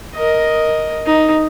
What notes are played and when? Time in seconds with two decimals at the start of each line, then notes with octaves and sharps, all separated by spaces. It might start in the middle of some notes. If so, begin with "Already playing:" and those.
0.15 A#4 D#5
1.06 D#4